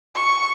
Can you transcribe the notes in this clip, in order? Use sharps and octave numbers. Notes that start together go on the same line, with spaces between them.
C#6